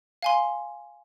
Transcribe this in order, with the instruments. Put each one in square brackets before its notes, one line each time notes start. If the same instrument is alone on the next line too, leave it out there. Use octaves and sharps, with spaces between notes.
[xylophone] F5 G#5 C6